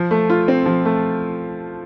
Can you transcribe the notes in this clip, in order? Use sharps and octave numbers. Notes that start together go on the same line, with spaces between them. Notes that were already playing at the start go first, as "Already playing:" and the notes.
Already playing: F3
A3
F4
C4
F3
A3